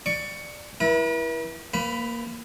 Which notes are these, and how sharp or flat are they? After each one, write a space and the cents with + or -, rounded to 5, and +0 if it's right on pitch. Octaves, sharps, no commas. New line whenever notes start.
D5 +15 C#6 +10
E4 +0 B4 -45
A#3 +0 B4 +35 B5 +0